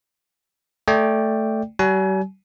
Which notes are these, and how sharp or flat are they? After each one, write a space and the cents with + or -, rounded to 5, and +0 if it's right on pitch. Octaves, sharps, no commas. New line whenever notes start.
A3 +0 D5 +0 G5 +0
G3 -45 G#5 +30